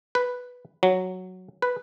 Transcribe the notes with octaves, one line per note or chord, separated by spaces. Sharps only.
B4
F#3
B4